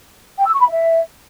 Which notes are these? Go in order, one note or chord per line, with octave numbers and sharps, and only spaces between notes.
G5
E6
C#6
B5
E5